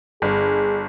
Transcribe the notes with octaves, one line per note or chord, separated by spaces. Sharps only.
G1 G#4